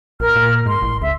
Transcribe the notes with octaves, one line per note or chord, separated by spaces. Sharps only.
A#1 A#4 F6
A#2
G#2 C6
A1
C#2 E5